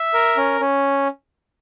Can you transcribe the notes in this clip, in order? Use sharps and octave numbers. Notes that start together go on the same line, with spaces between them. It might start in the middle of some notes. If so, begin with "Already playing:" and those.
Already playing: E5
A#4
C#4
C#4